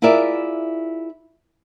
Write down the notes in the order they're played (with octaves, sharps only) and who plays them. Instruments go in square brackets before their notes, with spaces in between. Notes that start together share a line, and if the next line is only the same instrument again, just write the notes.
[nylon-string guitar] E4 F4 G#4 A#4 D5 E5